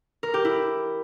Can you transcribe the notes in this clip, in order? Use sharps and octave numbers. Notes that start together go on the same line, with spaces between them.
A#4
G4
E4